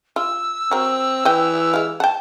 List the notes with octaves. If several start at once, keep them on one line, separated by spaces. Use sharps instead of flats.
F4 E6
F#3 C4 A#4
E3 B4 D#5 G5
G#3 F5
F#5 G5 A5